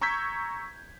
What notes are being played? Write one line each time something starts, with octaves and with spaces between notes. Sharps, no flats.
A#5 C#6 E6 G6 G#6 B6